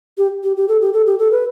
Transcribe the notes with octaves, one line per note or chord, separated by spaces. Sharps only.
G4
G4
G4
A4
G4
A4
G4
A4
B4